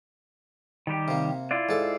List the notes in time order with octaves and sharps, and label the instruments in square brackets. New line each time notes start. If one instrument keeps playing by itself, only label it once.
[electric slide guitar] D#3 G3 G4
[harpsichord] C3 A#3
[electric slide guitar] E4 F4 D5
[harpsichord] G#2 A4 D6